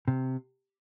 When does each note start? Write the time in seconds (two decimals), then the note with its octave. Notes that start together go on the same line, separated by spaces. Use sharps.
0.08 C3